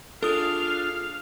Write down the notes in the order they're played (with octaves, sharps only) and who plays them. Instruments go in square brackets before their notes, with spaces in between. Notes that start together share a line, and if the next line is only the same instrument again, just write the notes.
[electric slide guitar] D4 F4 G#4 [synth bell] A4 D#6 [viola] F5